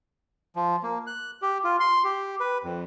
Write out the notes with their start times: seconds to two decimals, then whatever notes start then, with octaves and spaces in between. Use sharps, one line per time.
0.56 F3
0.83 A#3
1.07 F#6
1.42 G4
1.64 F4
1.80 C6
2.04 G4
2.40 B4
2.64 F2